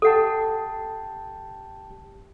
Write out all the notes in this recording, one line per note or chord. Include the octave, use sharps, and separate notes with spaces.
G4 A4 F#5 G5 A5